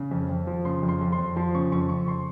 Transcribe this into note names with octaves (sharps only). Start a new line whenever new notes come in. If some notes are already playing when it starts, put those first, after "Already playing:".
Already playing: C#3
F2
F2
F3
C#3 C6
F2
C6
F2
C6
F2
F3 C6
C#3 C#6
F2 C#6
C#3 C#6
C6